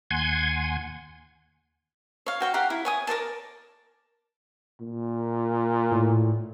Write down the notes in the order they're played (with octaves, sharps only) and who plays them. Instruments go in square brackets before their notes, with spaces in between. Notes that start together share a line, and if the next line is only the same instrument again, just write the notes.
[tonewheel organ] D#2 F#5 G#5 C6 G#6
[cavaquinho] C#5 F5
F#4 G5 C#6
G4 F5 F#5 A#5
E4
C#5 G#5 D#6
A#4 C#5 D5 A5
[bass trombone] A#2
[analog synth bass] A2